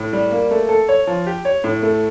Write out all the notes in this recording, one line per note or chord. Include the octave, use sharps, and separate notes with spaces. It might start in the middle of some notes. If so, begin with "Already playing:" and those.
Already playing: A2
G3
A#3
A3
A4
C#5
F3
G4
C#5
A2
A3